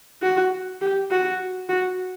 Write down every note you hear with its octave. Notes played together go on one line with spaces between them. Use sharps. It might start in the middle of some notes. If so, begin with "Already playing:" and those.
F#4
G4
F#4
F#4